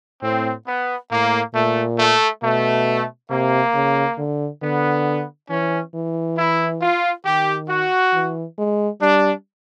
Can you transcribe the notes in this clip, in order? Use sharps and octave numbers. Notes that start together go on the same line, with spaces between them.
A2 C4
B3
A2 A#3
A#2 A3
A3
B2 A3
C3 A#3
C#3
D3
D3 B3
E3 C#4
E3
E4
F4
D#3 G4
F#4
E3
G#3
G3 D4